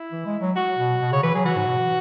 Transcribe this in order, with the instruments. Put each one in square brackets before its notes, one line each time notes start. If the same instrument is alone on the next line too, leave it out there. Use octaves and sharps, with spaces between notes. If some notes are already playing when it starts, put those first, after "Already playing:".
Already playing: [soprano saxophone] E4
[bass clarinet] E3
G#3
F#3
[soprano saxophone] F#4
[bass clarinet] B2
B2
[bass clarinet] C#3 [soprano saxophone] C#5
[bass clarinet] E3 [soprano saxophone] B4
[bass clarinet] F#3 [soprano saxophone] G#4
[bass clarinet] E3 [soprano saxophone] F#4
[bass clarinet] G#2
B2
E3